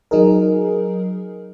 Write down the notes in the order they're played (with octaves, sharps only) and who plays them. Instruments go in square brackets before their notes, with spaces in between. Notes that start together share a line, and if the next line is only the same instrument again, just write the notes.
[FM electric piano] F#3 D#4 G#4 A#4